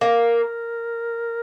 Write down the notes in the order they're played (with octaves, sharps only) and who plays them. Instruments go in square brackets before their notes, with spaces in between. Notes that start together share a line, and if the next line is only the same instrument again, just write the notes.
[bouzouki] A#3 [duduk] A#4